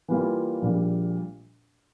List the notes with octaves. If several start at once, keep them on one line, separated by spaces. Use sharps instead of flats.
E3 G3 A#3 F4
A#1 A#2 G3